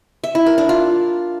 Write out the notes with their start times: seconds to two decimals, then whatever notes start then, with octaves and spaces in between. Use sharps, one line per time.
0.24 E5
0.35 E4
0.46 A#4
0.58 D4
0.69 F4